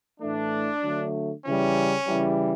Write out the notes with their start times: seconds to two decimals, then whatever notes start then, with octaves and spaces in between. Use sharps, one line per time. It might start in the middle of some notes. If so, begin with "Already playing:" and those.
0.21 A2 E3 A3 D4
0.82 D3 F#3 A3
1.44 C#3 E3 G3 C#4
2.06 C#3 E3 G3